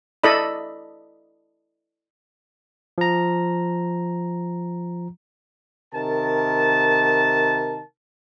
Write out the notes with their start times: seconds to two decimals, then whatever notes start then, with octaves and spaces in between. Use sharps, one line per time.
0.24 E4 A4 D5 D#5 B5
2.98 F3 A#5
5.95 C3 D#3 A#4 A5